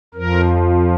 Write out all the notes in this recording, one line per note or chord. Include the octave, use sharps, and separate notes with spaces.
F2 F3 A#4